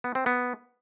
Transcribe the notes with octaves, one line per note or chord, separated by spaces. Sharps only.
B3
C4
B3